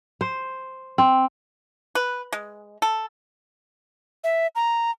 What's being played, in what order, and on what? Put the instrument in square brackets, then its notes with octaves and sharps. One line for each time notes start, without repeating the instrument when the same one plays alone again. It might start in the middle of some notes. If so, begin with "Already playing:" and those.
[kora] C5
C4
[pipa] B4
G#3
A4
[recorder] E5
A#5